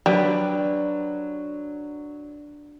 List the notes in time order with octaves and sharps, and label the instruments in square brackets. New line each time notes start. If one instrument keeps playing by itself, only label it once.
[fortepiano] F#3 [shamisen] G3 [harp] D4 B4 [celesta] D5